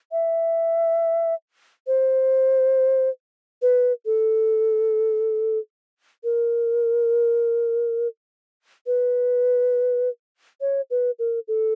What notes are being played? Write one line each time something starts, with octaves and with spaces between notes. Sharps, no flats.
E5
C5
B4
A4
A#4
B4
C#5
B4
A#4
A4